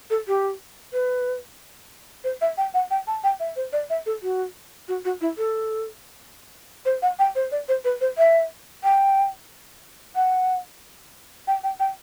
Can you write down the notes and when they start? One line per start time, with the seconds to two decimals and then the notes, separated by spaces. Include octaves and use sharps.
0.10 A4
0.27 G4
0.93 B4
2.24 C5
2.41 E5
2.57 G5
2.74 F#5
2.91 G5
3.07 A5
3.24 G5
3.40 E5
3.56 C5
3.73 D5
3.90 E5
4.06 A4
4.22 F#4
4.88 F#4
5.05 F#4
5.21 E4
5.37 A4
6.85 C5
7.02 F#5
7.19 G5
7.35 C5
7.51 D5
7.68 C5
7.84 B4
8.01 C5
8.18 E5
8.84 G5
10.15 F#5
11.47 G5
11.63 G5
11.80 G5